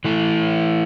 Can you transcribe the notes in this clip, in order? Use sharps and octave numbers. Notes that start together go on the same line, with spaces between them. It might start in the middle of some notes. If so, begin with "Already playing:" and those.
E3 A3 E4